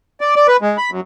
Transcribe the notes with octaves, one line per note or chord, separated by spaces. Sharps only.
D5
D5
B4
G#3
B5
F#2